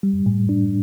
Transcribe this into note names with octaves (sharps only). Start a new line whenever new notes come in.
G3
A2
D4